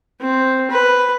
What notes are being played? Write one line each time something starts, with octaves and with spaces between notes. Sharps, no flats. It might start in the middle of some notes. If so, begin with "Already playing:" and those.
C4
B4